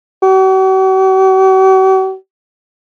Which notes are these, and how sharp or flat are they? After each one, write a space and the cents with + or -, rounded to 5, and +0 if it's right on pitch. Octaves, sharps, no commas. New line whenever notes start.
F#4 +45